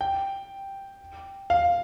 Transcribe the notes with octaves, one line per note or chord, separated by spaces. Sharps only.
G5
F5